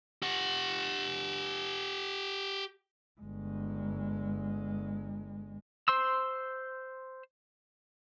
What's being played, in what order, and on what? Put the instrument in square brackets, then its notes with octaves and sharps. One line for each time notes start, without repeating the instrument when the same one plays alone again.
[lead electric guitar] G4 F#5
[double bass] G1 G#3
[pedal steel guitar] C5 C6 E6